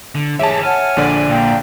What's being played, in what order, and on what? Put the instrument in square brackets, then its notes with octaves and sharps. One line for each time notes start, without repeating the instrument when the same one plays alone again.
[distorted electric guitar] D3
[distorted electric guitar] E3 G4 [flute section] G#4 C#5 [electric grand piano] E5 A5
[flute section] C#5 F#5 F6 [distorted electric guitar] G#5
[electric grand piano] A#1 D3 D5
[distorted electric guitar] A#2 [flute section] F5 G5